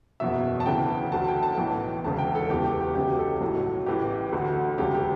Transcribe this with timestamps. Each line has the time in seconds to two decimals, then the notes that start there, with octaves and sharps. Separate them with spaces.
0.20 F#1 E2 B2 F#3 E5
0.60 A5
0.66 D2 C#3 E3 G5
1.12 D2 D3 F#3 A5
1.28 G5
1.43 A5
1.58 B1 A2 E3 G5
2.04 E1 D2 C#3 A5
2.18 G5
2.35 A4
2.50 E1 E2 C#3 E3 G4
2.65 G4
2.80 G4
2.95 C#2 C#3 F#3 G4
3.19 A4
3.41 B1 A2 F#3
3.86 A1 A2 E3 G4
4.32 D2 D3 F#3
4.78 E1 D2 C#3 F#3 G4
4.94 G4